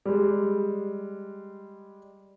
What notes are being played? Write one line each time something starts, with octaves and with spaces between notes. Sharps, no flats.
G3 G#3